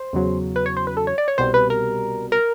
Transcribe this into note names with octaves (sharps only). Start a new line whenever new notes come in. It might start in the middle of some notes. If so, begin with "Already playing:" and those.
Already playing: C5
E2 C#3 F#3
B4
C#5
C5
B4
A4
C#5
D5
C#5
C2 B2 G3 C5
B4
A#4
A#4